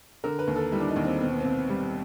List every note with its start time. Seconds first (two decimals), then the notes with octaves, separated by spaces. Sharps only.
0.24 D3 A#4
0.39 B4
0.47 D#2
0.56 A4
0.72 G3 E4
0.81 D4
0.88 D#4
0.96 D#2
1.05 C4
1.20 B2 C4
1.31 B3
1.40 C2 C4
1.69 G3